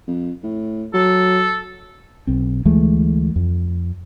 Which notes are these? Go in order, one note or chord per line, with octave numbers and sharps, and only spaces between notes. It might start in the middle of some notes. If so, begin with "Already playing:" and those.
F2
A2
F#3 A4
B1 C4
D2 E3 G#3 A3
F2